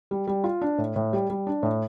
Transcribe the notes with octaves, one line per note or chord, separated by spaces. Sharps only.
G3
G3
F4
D4
A2
A2
G3
G3
D4
A2